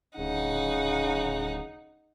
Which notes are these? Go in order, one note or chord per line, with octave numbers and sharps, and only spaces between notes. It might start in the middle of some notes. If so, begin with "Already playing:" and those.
D1 C#3 D#4 F#5